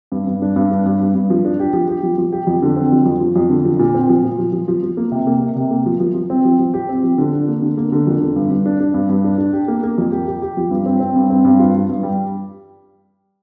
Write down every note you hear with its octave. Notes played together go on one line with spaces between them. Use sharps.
G2
G2
D4
G2
D4
G2
G2
G2
F3
D4
G4
F3
G4
F3
F3
G4
F2
D3
C4
F2
F2
F3
F2
D3
F3
A#2
C4
F3
A#2
F3
F3
F3
F3
A#3
C3
A#3
C3
C3
A#3
F3
F3
F3
C4
F3
F3
G4
C4
F3
D3
D4
A#3
D3
A#3
D3
F2
D3
G2
G2
D4
D4
G2
G2
D4
D4
G4
A#3
A#3
F2
G4
G4
G4
F3
G2
C4
C4
G2
C4
G2
F4
G2
G2
G3